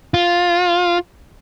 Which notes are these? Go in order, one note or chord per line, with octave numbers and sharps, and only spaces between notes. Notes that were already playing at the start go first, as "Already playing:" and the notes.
F4